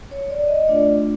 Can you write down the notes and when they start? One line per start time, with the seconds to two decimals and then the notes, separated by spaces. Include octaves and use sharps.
0.11 C#5
0.30 D5
0.48 D#5
0.67 A3 D4 F4 D5